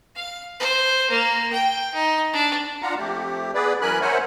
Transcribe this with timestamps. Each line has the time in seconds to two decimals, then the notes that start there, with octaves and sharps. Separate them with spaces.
0.16 F5
0.60 C5
1.11 A#3
1.52 G5
1.94 D#4
2.33 D4
2.82 D4 F4 F#5 A#5
2.98 F2 A3 G4
3.54 B3 G#4 B4 D5
3.82 F#2 E3 A#4 G#5 B5 F#6
4.01 A#4 C5 C#5 E5 F#5 G#5